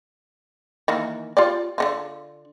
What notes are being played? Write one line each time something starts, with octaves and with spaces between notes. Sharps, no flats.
D#3 E3 A#3
F4 G4 D5
D3 D#3 F4